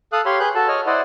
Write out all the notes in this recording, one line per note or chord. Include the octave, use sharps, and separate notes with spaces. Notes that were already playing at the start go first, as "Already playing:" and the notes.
A4 F5 D#6 F#6
G4 C#5 F5 B5 C6
G#4 B4 F#6 G6
F#4 A4 A5
C#5 D#5 F6
E4 C5 D5 D#5 F#5